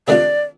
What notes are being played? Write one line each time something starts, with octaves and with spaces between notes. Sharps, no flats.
C3 D#3 A3 D4 F4 D5